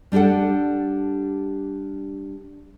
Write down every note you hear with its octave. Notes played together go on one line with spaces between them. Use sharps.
G3 D4 G4 A4 F#5